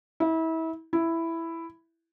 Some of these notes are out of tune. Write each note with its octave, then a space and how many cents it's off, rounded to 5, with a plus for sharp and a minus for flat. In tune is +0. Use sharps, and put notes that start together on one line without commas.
E4 -30
E4 +5